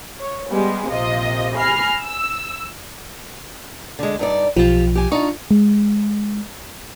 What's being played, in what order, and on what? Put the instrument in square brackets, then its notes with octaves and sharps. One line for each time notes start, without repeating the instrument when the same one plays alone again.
[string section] C#5
G3 G#3 B3
A#1 C3 F4 D#5
G#5 B5 F6 A#6 C7
E6
[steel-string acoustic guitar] D3 G#3
G2 D#4 D5
[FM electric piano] B1 F3 [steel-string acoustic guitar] F4 G4
[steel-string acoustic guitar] G4 G#5
[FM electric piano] D4 C#6 [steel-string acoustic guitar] D#4 F4
[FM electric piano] G#3